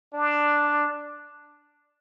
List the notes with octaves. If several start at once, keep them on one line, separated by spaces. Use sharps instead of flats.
D4